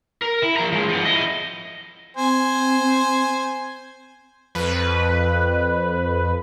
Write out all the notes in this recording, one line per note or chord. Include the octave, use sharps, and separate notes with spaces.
A#4
E4
F3 A#5
F3 G#3
F3 B3
E4 D#5
C4 C5 G#5
F2 B4